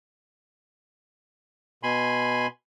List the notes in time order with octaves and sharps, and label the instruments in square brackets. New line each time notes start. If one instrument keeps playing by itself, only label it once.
[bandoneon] B2 G#5 B5 C6